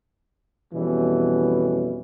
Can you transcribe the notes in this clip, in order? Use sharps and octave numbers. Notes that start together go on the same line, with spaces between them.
F2 B2 E3 G3 C#4 B4